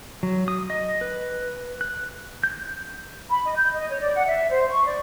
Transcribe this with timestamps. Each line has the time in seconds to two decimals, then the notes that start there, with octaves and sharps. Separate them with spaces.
0.23 F#3
0.48 D#6
0.70 D#5
1.01 B4
1.81 F#6
2.44 G6
3.30 B5
3.44 D#5
3.56 G6
3.75 D#5
3.89 C#5
4.01 D5
4.15 F#5
4.27 E5
4.49 C5
4.69 C#6
4.86 D5